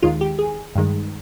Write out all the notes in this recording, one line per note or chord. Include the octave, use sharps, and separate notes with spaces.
D#2 D#3 G#3 F4
G4
G#4
G2 D#3 G#3